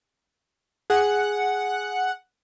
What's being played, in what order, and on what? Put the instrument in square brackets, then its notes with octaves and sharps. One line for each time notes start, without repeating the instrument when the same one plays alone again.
[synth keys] G#4 [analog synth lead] F#5